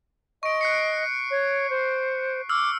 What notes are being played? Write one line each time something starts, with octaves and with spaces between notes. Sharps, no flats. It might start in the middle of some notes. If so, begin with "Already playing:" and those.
D#5 C#6 D7
F#6 C7 C#7
C#5
C5
D6 E6 F6